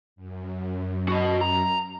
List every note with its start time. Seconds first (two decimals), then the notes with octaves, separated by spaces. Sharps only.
0.16 F#2
1.08 F#4 D#5
1.41 A#5